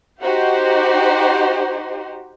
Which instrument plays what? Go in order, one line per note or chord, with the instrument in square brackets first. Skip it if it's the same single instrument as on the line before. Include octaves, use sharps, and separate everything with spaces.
[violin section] D#4 F#4 G4 C5